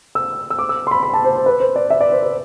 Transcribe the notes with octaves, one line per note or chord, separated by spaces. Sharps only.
E6
E6
D6
E6
C6
B5
B5
A5
C5
C5
B4
C5
D5
E5
D5
C5
B4